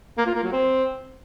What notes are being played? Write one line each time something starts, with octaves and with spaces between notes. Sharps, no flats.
A#3
F4
A#3
F#3
C4